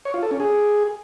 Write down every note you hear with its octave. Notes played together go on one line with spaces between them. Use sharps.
C#5
F4
A4
C#4
G#4